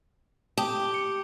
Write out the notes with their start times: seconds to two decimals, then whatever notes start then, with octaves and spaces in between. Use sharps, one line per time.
0.57 G4 G5 A5 D#6
0.94 C#7